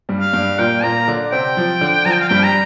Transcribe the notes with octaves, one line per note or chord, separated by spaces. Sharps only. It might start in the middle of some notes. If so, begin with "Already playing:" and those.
G2 G3
F5
G2 G3
A#2 A#3 G5
A#2 A#3 A#5
D3 D4
C3 C4 G5
F3
D3
F3 A#5
G5
F5
G2 G3 G5
A#5